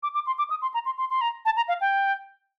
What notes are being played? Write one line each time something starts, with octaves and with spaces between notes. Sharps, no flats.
D6
D6
C6
D6
D#6
C6
A#5
C6
C6
C6
A#5
A5
A#5
F5
G5